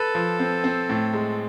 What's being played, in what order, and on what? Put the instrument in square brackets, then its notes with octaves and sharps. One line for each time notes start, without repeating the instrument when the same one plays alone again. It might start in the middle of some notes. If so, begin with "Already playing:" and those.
Already playing: [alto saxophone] A4 [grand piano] B4
[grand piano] F3
C4
C4
A2
G#3